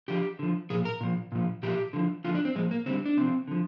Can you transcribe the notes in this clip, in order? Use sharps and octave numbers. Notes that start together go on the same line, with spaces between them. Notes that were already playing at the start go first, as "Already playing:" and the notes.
D3 F3 G4
D3 F3
A#2 F3 G#4
A#4
A#2 F3
A#2 F3
A#2 F3 G4
D3 F3
D3 F3 F4
D4
C4
A#2 F3 G#3
A#3
D3 G3 C4
D4
C3 F3 C4
D3 F3